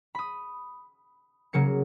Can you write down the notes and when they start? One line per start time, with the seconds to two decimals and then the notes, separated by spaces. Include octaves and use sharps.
0.15 B5 D#6
1.53 C#3 F#3 A#3 C#7